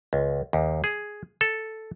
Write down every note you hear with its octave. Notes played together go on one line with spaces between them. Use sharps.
C#2
D#2
G#4
A4